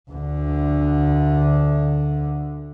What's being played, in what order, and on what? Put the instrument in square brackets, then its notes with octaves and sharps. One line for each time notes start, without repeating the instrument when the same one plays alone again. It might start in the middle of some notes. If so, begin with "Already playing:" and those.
[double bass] D2 D3